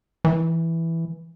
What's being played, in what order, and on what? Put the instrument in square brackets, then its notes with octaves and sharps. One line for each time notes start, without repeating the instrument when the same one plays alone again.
[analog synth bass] E3